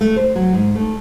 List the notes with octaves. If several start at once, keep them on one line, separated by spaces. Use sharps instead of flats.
A3
C5
F#3
G#2
A3